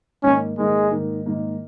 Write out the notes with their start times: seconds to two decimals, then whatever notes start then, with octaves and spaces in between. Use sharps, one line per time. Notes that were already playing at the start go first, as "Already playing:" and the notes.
0.23 G#2 D#3 A#3 C#4
0.57 G#2 D#3 G#3 A#3
0.91 G#2 D#3 A#3
1.26 G#2 D#3 A#3